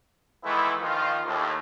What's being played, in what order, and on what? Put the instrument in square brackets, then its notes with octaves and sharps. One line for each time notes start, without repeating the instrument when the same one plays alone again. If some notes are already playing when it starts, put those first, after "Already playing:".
[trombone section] D#3 E3 G#3 A3 B3 E4
A#1 D#3 F3 F4
D#2 A2